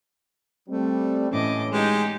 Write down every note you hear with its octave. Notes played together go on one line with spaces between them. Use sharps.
G3 A3 C4
A2 E3 C#4 D#5 D6
G#3 D#4 G4